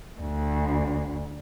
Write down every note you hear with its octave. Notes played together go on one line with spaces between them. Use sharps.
D2